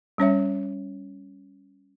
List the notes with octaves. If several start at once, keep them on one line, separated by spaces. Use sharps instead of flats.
G3 C#4 C#5 E5